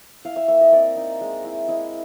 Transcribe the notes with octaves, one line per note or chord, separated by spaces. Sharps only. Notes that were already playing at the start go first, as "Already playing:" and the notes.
E4 F5
E5
A#3 E5
D#5
C4 D5
D#4
G#3
E4
E4 D#5